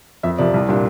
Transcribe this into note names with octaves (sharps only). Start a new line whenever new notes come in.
F2 E5
C3 F3 D5
C2
A#2 G3 D4